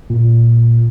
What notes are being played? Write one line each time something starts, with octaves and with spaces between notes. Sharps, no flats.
A#2